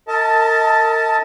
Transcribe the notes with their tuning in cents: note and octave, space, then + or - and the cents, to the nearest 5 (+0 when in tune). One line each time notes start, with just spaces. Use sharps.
A#4 -40 D#5 +35 A5 +0